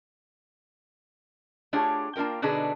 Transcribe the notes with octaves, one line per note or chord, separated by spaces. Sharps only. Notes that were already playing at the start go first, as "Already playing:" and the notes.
A3 D4 F4 G4 G#4 C#5
A#3 D4 F4 A#4 G5
B2 D3 D4 D#4 G#4 B4